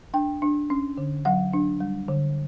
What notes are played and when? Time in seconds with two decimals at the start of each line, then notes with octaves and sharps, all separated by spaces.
0.14 D4 G5
0.42 D4
0.70 C#4
0.97 D3
1.25 F#3 F#5
1.53 D4
1.80 G3
2.08 D3